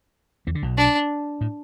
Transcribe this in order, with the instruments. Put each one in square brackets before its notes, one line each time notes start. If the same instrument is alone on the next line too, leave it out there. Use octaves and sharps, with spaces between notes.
[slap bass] E2 E3
D3
B1 B2
[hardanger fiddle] D4
[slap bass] A2